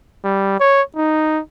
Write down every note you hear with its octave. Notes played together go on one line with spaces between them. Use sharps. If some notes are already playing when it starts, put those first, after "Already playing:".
G3
C#5
D#4